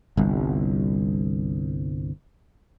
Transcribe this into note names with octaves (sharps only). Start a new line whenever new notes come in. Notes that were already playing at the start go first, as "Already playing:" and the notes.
G1 C2